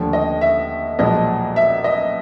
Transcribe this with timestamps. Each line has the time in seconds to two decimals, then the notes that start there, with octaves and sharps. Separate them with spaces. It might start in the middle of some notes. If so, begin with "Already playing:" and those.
Already playing: D#2 D3 F3 A3
0.13 D#5
0.41 E5
0.99 B1 A#2 F3 G#3 D#5
1.56 E5
1.84 D#5